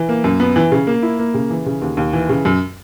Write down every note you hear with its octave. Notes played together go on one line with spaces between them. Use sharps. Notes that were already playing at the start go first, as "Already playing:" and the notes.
Already playing: E3
A#3
F#2
B3
E3
C#3
A#3
E4
A#3
C#3
E3
C#3
D#2
D#2
E3
C#3
F#2